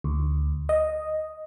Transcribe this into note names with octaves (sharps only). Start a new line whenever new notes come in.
D2
D#5